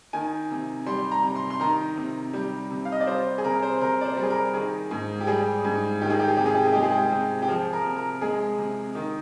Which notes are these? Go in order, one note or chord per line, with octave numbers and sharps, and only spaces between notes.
D#3 G#5
C3
G3 C6
A#5
C3
C6
C6
D#3 A#5
C3
G3
C3
F5
D#5
D5
G3 C5
G#4
C3 A#4
C5
C3 A#4
D5
C5
G3
G#4
A#4
D#3 G#4
G#2
G4
G3 G#4
G#2
D#3 G4
G#4
G4
G#4
C3 G4
G#4
G4
G#4
G#3 G4
G#4
G4
C3
G4
F3 G#4
A#4
C3
A#4
G#3 G#4
C3
D#3